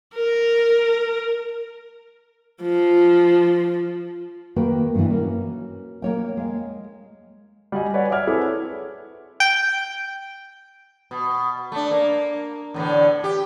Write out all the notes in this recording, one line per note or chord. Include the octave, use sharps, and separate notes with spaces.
A#4
F3
D#3 A#3 F#4 B4 G5
G2 B2 E3
A#3 C#4 F#4
A#3 C#5 G5
G#3 F5
G3 F#4 D#5 G#5
B4 C#5 D5 F#5 G#5
D5 E5 F#5 D6 F6 G#6
C4 E4 G#4 A4 B4 C#5
G5
B2
A3 D4
A#3
E2 A2 D3
G4